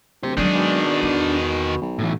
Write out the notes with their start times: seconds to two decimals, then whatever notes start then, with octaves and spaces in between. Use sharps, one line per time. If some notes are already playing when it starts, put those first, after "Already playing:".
0.23 D1 G4 C5
0.37 D#3 F#3 G#3 D4 G#4
0.55 B2
1.03 E2
1.81 B1
1.99 A2 E3